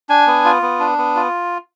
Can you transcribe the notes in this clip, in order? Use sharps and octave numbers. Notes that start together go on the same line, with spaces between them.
D4 G#5
B3
F4
B3
D4
B3
F4